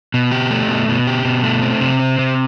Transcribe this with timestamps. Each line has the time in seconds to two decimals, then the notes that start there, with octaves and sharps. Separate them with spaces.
0.14 B2
0.32 G4
0.50 A3
0.69 B2
0.88 B2
1.07 G4
1.25 B2
1.44 A3
1.62 C4
1.81 C3
1.99 C4
2.19 C3